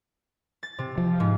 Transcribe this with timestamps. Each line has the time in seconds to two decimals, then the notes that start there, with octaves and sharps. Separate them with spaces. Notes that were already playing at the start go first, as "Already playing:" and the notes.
0.63 A6
0.78 C3
0.98 F3
1.20 G#2